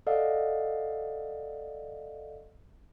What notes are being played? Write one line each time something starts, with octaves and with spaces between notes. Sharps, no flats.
A4 D5 D#5 F5 F#5